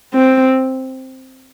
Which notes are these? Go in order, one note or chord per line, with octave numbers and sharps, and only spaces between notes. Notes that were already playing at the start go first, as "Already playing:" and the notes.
C4